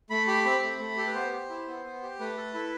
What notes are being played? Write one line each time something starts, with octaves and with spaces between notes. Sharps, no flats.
A3 B5
G4 B5
C4 B5
A3
A3
G4 A4
B4
B3 C5
G4
E4
B3
B3
G4
A3 B4
A4
E4